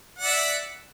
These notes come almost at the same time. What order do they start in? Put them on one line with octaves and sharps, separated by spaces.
F#5 D5 E5